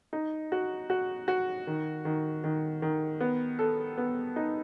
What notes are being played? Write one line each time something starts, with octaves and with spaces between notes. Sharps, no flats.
D#4
F#4
F#4
F#4
D#3
D#3
D#3
D#3
B3
A4
B3
D#4